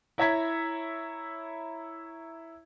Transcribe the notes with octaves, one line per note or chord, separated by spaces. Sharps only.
E4 C#5 E5 A#5 G#6 B6